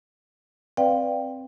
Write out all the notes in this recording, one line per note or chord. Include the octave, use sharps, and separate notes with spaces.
C4 B4 D5 F5 G5